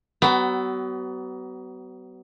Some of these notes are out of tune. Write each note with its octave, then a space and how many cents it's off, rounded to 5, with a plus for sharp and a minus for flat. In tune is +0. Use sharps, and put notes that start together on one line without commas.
F#3 +40 B3 +20